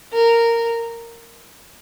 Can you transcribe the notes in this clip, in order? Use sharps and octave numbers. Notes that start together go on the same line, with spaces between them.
A#4